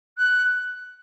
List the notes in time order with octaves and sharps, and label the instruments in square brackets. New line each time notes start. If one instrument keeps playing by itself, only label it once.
[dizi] F#6